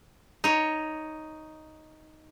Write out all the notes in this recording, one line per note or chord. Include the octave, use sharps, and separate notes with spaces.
D#4 C#5